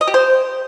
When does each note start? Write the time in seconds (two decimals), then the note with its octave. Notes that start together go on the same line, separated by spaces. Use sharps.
0.01 D#5
0.07 G4
0.14 C5